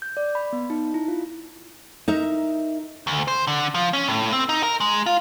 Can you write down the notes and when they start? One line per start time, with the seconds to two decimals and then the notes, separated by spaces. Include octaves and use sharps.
0.02 G6
0.17 D5
0.35 B5
0.53 B3
0.70 D#4
0.94 E4
1.08 F4
2.08 D#4 A#4 E5
3.07 D2
3.28 C5
3.47 D3
3.75 F3
3.93 C#4
4.08 A2
4.33 C4
4.49 D#4
4.63 A#4
4.80 G#3
5.06 F4